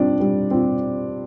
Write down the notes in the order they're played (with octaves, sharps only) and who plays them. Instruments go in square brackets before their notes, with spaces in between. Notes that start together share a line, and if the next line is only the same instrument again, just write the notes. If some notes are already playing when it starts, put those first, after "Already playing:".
Already playing: [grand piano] G3 C4 F4 [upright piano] D4 D5
[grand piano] G3
C4 F4